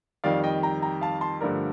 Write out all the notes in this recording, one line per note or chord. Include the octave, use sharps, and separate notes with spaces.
F2 D#3 G3 D5 F5
D#5 G5
G5 A#5
G5 A#5
F5 A5
A5 C6
G2 D3 F3 A3 A#4 D5